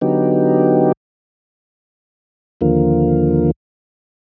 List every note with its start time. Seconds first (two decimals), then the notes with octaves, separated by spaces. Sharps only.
0.01 D3 F#3 B3 D#4 G4
2.61 D#2 D3 F3 A#3